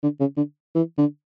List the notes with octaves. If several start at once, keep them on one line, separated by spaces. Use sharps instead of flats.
D3
C#3
D3
E3
D3